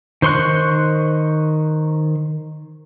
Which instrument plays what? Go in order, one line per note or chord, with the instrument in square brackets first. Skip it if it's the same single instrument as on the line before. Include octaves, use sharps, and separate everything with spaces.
[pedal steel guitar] D#3 C5 C6 C#6 F#6